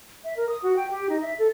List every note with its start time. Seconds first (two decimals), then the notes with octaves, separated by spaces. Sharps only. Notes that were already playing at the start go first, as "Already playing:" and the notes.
0.24 E5
0.37 A#4
0.49 D#6
0.63 F#4
0.76 G5
0.91 G4
1.09 D#4
1.22 E5
1.39 A4